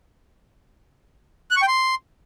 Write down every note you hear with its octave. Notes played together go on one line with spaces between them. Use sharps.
F#6
C#6
G5
C6